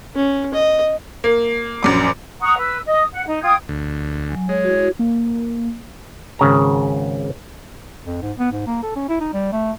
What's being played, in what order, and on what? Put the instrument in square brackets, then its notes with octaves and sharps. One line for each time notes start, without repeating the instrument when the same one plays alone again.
[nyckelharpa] C#4
D#5
[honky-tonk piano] A#3
A#1 F#2 D6
[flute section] F#5 A#5 C#6 D#6
B4 E6
D#5 D#6
F#5
D#4
F4 G5 D#6 G#6
[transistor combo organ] D2
[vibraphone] F#3 G#5
[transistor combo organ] G#3 [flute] C#5
[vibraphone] E4 F#4
[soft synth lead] A#3
[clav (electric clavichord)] G#1 C#3 A#5
[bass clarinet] F2
G#2
B3
G#2
A#3
A4
C#4
E4
D#4
G3
A3